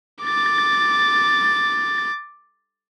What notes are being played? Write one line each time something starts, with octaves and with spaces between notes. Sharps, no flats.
D6 A6